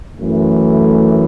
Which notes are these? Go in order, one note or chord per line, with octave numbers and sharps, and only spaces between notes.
F#2 E3 A3